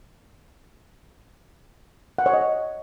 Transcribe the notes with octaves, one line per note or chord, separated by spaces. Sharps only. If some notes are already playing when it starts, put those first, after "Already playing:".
F#5
C#5
D#5
C#5